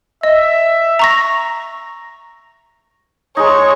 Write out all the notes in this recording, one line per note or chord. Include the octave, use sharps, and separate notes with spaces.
D#5 E5
A#5 C#6 A#6
G#3 D#4 C#5